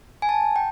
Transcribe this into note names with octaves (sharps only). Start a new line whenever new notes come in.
G#5
A5
G5